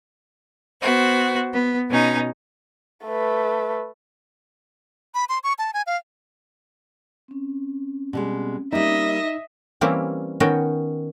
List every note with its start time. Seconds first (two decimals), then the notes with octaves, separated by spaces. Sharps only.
0.81 B3 F#4 C5
1.52 B3
1.89 B2 C#4 D#4
3.06 A3 B4
5.14 B5
5.29 C6
5.44 C#6
5.59 A5
5.74 G#5
5.87 F5
7.28 C4 C#4
8.13 B2 G3 G#3
8.73 G3 A#3 D#4 D#5 E5
9.81 E3 G3 A#3 C4 C#4 E4
10.40 D#3 B3 C#4 F#4 G5